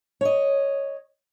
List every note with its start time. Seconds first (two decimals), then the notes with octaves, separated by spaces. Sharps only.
0.21 C#5 D#5